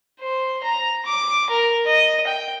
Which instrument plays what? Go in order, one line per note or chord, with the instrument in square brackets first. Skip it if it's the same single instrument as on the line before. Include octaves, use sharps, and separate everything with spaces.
[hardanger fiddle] C5
A#5
D6
A#4
D#5
G5